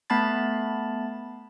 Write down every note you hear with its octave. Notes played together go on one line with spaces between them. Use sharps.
A3 B3 A5 B5 A6